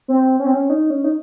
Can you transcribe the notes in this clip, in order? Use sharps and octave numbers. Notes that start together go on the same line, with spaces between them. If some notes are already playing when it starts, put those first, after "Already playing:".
C4
C#4
C4
C#4
D#4
C#4
D#4